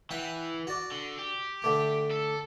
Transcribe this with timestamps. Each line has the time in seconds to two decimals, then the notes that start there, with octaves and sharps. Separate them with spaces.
0.11 E3 E5 F#5 G5
0.67 F#4 D5
0.92 D3
1.19 G4
1.62 D3 A3 D6
2.11 A4